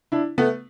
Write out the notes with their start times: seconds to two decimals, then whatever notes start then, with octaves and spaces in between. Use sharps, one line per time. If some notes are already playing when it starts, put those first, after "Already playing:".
0.12 D4 E4
0.38 A3 B3